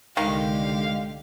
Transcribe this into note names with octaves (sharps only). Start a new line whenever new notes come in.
C2 D3 D#3 G#3 G4 F5